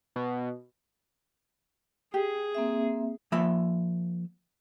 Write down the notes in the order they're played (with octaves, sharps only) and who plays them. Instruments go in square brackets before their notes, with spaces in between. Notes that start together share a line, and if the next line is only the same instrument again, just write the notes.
[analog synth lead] B2
[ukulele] G4 [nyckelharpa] G#4
[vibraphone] A#3 C4 E5
[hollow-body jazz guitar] F3 A#3 E5 B5